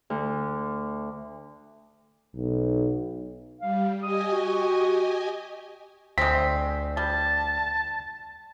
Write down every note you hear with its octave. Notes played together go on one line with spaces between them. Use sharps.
D2
B1
G3 F5
G4 D#5 G#5 D#6
F#4
D2 G#3 C4 B6
G3 A5